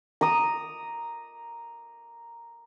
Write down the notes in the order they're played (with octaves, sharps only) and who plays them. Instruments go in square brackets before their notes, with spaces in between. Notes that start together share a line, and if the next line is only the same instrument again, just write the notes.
[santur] A#5 D6 D#6